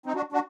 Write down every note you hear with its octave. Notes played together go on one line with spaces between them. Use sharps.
C4 D#4
D4 F#4
D4 F#4